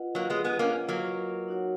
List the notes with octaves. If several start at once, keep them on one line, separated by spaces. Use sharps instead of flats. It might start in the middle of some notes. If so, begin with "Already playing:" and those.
Already playing: F4 B4 D#5 F#5
F#3 A#3
G#3 B3
G#3 B3
A#3 C#4
F#3 A#3
D#4 F#4 C#5 F#5